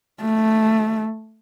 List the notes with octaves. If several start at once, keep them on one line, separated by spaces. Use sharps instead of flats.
A3